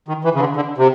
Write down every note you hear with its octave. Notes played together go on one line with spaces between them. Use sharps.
D#3
E3
C#3
D3
D3
C3